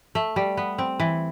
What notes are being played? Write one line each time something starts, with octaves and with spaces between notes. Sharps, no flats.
A3
G3
B3
C4
E3